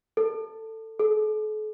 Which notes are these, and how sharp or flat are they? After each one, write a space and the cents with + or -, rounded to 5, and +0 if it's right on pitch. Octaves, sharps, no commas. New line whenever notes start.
A4 +15
A4 -45